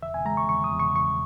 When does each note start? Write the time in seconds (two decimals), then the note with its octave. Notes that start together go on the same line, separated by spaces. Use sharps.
0.02 E2 E5
0.14 G#5
0.25 G#3 A#5
0.37 C#6
0.49 E2 C#6
0.64 D#6
0.72 E2
0.80 C#6
0.95 E2 C#6